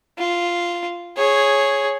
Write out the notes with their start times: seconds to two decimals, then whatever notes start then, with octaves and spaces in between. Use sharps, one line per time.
0.18 F4
1.16 G#4 C#5